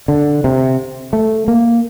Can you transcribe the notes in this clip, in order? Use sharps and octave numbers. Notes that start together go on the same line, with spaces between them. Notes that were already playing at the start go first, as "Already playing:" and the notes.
D3
C3
A3
A#3